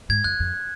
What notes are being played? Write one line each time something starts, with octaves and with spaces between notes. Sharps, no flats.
G#2 G#6
F#2 F#6
F2